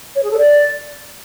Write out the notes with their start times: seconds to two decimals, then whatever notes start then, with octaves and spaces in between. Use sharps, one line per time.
0.16 C#5
0.23 G#4
0.30 A4
0.37 D5